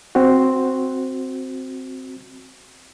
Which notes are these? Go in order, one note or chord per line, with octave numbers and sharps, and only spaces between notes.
C4 F#4